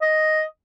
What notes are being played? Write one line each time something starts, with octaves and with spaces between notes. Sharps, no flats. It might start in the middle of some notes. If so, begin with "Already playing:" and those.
D#5